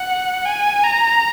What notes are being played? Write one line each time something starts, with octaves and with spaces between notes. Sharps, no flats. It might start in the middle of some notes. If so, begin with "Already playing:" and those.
Already playing: F#5
G#5
A#5